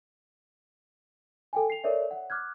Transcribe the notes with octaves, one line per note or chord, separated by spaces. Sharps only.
A4 G5 G#5
C7 F7
A4 A#4 C#5 D5 E5
F#5
D6 F6 F#6 G#6